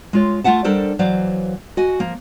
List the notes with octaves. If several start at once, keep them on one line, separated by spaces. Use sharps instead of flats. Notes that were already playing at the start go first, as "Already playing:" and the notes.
G#3 F4 C#5
A3 F4 E5 F#5 A5
G3 D4 A4 A#4 C5
E3 F#3 C5 D5 F5
F#4 D#5 G#5
F3 A#3